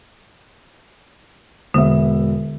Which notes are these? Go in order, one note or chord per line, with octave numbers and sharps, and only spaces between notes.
E1 D3 B3 E5